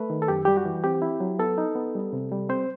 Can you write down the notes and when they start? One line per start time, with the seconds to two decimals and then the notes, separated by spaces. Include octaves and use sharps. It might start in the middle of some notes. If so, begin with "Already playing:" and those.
Already playing: A3 B4
0.10 D#3
0.22 A4
0.28 F#2 G4
0.45 G3 G4
0.57 F#4
0.65 E3
0.84 C4 G4
1.02 E4
1.20 F#3
1.39 B3 A4
1.58 D#4
1.75 B3
1.95 G3
2.13 C3
2.32 G3
2.49 C4 C5